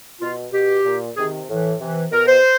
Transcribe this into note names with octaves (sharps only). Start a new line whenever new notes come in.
B2 F4
B2 G4
A#2
C3 D#3 G#4
A2 E3
C3 E3
B2 A#4
C5